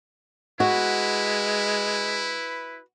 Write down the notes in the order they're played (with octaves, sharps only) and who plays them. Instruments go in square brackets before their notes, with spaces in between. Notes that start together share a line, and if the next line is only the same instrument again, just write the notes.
[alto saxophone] G#3 [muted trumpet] E4 [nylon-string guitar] F#4 [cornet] B4